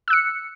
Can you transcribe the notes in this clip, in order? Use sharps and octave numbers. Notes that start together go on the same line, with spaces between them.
E6 F#6 C#7